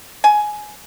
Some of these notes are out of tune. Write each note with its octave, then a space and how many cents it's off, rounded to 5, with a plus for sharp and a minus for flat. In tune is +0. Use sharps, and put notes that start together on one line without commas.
G#5 +15